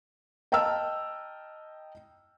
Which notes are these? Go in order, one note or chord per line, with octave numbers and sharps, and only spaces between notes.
D#5 G5 A5 A#5 E6 F6